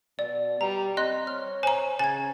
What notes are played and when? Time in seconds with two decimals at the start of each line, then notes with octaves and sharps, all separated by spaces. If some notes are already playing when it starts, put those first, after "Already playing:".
0.19 B2 D5
0.61 G3 A#5
0.97 C4 D#5 C6 F#6
1.27 C#5 F6
1.63 C5 G#5 A#5
1.99 C#3 G#5 G#6 A6